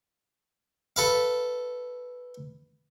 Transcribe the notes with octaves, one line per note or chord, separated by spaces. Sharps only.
A4 B4 F5